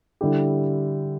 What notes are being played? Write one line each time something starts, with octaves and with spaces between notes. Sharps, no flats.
D3 G3 E4 G4